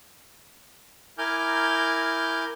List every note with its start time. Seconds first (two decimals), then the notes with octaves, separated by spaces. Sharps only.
1.18 E4 A#4 G#5 D6 F6 G6